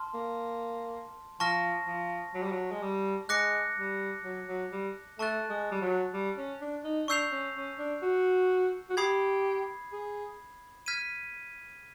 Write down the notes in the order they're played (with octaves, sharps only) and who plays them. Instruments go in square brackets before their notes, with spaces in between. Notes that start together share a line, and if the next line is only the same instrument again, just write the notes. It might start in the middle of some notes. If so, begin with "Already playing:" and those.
Already playing: [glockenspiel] A5 C6 F6
[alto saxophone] A#3
[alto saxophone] F3 [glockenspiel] A5 C#6 F6 A#6
[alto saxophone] F3
F#3
G3
F#3
G#3
G3
[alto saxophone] G#3 [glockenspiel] D6 F#6 A#6 C#7
[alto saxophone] G3
F#3
F#3
G3
[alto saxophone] A3 [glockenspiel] A5 C#6 F#6 A6
[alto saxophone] G#3
G3
F#3
G3
C#4
D4
D#4
[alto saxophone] D4 [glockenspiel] C#6 E6 G6 C7 F7
[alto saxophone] C#4
C#4
D4
F#4
F#4
[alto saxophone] G4 [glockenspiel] B5 D#6 G#6 C7
[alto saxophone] G#4
[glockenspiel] F6 G#6 B6 D#7